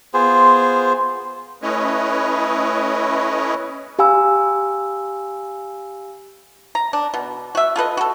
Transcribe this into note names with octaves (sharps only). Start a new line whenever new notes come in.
B3 F4 G#4 C5
A3 C#4 E4 B4 C#5 D#5
G4 F5 G#5 B5 E6
A#5
D4
B2
F#4 E5
F4 A4 B4 D#5
F#4 A4